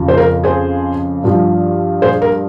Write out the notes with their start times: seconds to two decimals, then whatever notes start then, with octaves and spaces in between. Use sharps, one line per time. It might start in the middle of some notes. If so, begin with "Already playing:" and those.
Already playing: F2 C#3 F3
0.08 C5
0.17 A#4
0.44 G#4 C5
1.24 G2 F3
2.02 G#4 C5
2.22 A#4